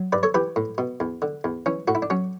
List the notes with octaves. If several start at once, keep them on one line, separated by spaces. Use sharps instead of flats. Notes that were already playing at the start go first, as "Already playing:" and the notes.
Already playing: F#3
G2 B4 D5
A4 C#5
E3 G4 B4
A2
B2
E2
D3
E2
E3 C#4
A2 F#4
E4
D4
F#3 C#4